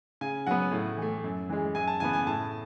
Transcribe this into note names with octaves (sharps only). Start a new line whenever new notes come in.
C#3 G#5
F#3 B3 F#5
A2
E3 A3
F#2
E3 G#3
F#2 G#5
A5
C#3 E3 B3 G#5
G#5
A2 A5